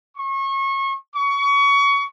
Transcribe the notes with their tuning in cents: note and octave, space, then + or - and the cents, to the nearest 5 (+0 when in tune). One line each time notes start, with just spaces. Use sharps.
C#6 -30
C#6 +25